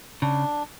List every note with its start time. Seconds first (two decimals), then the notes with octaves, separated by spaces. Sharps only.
0.22 C#3 D4